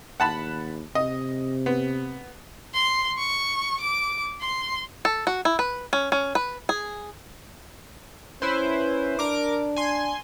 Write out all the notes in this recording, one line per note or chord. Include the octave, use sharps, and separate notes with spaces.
D#2 F#5 A5 B5
C3 D#5
B3
C6
C#6
D6
C6
A4
F#4
E4
B4
C#4
C#4
B4
G#4
C#4 E4 B4 C5
D4 A#4 D6
G#5 C6